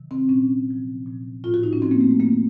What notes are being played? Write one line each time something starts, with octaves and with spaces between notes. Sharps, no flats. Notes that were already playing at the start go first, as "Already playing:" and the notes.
Already playing: C3 D#3 F#3
C4
A#2 F#3 C#4
C3 F3
A#2 F3
A2 F3 F4
F#4
D#4
C#4
A2 F3 C4
A#3
A3
A3
C3 F#3 A#3